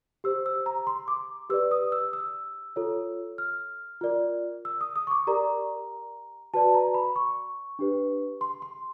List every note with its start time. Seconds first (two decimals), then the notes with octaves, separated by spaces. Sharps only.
0.24 G4 C5 E6
0.46 E6
0.66 A#5
0.87 C6
1.08 D6
1.50 G4 B4 D5 E6
1.71 D#6
1.92 E6
2.13 E6
2.76 F4 A4 C#5
3.38 F6
4.01 F4 A#4 D5
4.65 E6
4.81 D#6
4.96 D#6
5.07 C#6
5.11 D6
5.27 G4 A#4 D5 A#5
6.54 F#4 B4 D5 A5
6.74 A#5
6.94 B5
7.16 C#6
7.79 D4 G4 B4
8.41 C6
8.62 C6